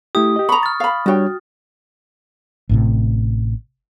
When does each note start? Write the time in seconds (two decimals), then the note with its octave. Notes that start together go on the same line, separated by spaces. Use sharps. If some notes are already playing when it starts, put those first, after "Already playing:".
0.15 A3 E4 G4 D#6
0.36 G4 D#5
0.49 A#5 B5 C#6
0.63 F6 A6
0.80 F5 B5
1.06 G3 D4 F#4 C#5 G5
2.69 A1 A2 C3